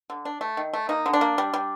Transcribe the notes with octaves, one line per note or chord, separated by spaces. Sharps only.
D3
D4
A3
D#3
A3
A#3 D#4
D3
D4
A#3
G3
G3